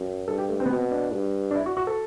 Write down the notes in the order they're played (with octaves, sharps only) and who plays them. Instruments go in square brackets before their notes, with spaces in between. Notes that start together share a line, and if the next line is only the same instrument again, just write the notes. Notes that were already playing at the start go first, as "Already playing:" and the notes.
Already playing: [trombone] F#2
[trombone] G2 [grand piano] A4
[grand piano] G4
A3
C4
B3
[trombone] B2 [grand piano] C4
[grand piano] D4
[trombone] G2
[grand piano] D4
E4
F#4
F#4
A4